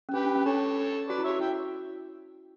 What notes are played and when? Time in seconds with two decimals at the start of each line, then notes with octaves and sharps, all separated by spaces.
0.09 C#4
0.14 D4 G4 B4
0.25 D4
0.35 C#4
0.45 D4 A4 C#5
1.08 F#4 B4 D5
1.18 E4
1.24 C#5 E5
1.30 F#4
1.40 E4 E5 G5